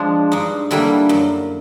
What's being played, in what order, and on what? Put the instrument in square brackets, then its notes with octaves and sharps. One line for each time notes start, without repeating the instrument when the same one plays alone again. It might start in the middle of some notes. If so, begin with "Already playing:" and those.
Already playing: [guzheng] F3 G#3 D4
G2 D#4
D3 G3 A#3 E4
F#2